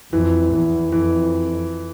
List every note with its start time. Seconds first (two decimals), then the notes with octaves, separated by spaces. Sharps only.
0.13 F2 E3
0.53 E2 E3
0.92 F2 E3